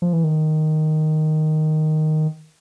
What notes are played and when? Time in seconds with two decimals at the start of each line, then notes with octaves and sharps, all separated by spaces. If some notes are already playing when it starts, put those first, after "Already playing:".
0.02 F3
0.13 E3
0.24 D#3